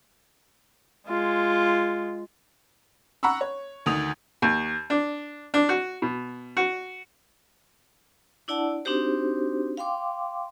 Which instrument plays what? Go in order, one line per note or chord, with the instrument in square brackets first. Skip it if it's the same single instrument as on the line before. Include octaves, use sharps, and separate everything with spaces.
[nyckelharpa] G#3 F4
[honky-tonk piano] F#5 A#5 B5 C#6 E6
C#5
D2 D#3 D#6 F7
[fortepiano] D#2
D4
D4
F#4
B2
F#4
[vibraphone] D4 E4 D5 F#5 A5
C4 D4 D#4 F#4 G4 C5
F5 G5 C6 D6